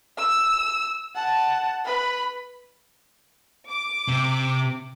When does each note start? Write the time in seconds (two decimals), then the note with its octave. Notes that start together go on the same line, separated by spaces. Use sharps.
0.18 E6
1.15 F#5 A5
1.85 B4 B5
3.69 D6
4.08 C3